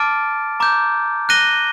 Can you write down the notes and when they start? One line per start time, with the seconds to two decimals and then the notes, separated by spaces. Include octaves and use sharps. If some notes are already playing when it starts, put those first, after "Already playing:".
Already playing: A5 D6 F6 A6 D7
0.60 A#5 D6 G6
1.29 F#6 A#6 D#7 G7